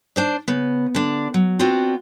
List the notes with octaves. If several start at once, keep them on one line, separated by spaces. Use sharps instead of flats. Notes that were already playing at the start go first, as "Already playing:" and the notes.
D4 C5 D5
C#3 B3
D3 D4
F#3
B3 C4 D4 F4 F#4